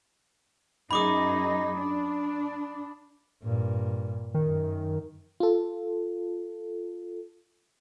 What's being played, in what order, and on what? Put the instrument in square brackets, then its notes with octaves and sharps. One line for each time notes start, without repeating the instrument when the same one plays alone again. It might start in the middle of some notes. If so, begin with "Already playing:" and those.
[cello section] F#2 D#4 G#4 [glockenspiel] B5 D6 D#6
[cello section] D4
[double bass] G2 A#2
[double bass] F#2 [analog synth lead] D#3
[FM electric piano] F4 A4